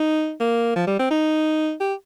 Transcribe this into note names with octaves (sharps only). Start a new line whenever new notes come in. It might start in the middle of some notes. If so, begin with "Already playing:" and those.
Already playing: D#4
A#3
F3
G3
C4
D#4
G4